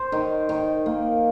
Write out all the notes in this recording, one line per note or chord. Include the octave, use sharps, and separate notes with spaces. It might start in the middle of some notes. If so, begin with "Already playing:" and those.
Already playing: C5
D#3
D#3
A#3